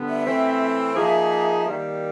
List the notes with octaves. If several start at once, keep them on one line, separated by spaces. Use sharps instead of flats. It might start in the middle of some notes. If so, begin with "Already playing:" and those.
Already playing: D3 G3 B3
E5
E3 A3 C4
F3 A#3 D#4 G#4 E5
D#3 G3 A#3